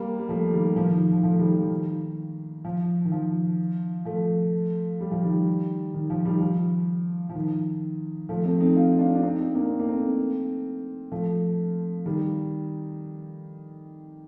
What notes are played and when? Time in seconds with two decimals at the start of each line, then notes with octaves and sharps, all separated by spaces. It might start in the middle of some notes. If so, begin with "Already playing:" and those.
Already playing: G3 A#3
0.18 G3
0.29 F3 A3
0.53 D#3 G3
0.76 F3
0.88 D#3
1.00 D#3
1.12 F3
1.23 F3 A3
1.39 D#3 G3
1.55 F3
1.70 D#3
2.65 F3
3.05 D#3
3.12 F3
4.05 F3 A3
5.01 G3
5.11 F3
5.23 D#3 G3
5.94 D#3
6.10 F3
6.25 D#3 G3
6.40 F3
7.30 F3
7.35 D#3
8.29 F3 A3
8.44 A3 C4
8.60 C4 D#4
8.77 F4
8.99 D4 F4
9.15 D4
9.23 C4 D#4
9.39 C4 D#4
9.54 A#3 D4
9.70 C4
9.79 A#3
9.88 A3 C4
11.12 F3 A3
12.06 D#3 G3